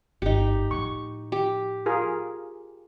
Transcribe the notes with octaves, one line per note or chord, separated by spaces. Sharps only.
G1 G#2 D#4 G4
A2 F3 C#6
G4
F4 G#4 A#4